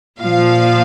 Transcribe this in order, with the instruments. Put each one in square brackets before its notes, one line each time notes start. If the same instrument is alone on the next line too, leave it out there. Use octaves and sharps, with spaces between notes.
[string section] A#2 F3 F5